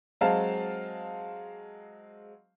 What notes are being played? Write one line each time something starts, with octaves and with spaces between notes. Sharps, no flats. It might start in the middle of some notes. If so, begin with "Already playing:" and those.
F#3 G#3 C4 F5 A5